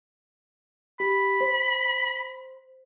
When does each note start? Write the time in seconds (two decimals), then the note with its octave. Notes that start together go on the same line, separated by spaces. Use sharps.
1.00 G4 B5
1.41 C5